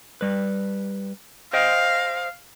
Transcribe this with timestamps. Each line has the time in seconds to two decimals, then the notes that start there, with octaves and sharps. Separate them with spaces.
0.21 G3 B4
1.53 C5 D#5 F5 G5